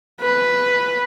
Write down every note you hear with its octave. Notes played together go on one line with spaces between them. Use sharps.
B4